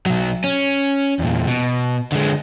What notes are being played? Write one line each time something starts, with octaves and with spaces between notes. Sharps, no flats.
B1 F#3
C#4
E2 A#2
B2
D3 G#3